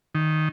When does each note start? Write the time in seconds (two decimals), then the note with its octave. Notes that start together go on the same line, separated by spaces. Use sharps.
0.15 D#3